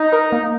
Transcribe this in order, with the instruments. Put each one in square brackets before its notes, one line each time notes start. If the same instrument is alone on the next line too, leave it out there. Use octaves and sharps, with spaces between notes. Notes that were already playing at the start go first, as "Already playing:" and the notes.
Already playing: [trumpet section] D#4
[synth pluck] A#4
A#3